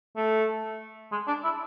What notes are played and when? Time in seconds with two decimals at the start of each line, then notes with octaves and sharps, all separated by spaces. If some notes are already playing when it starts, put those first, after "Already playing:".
0.16 A3
1.11 G#3
1.27 D4
1.44 E4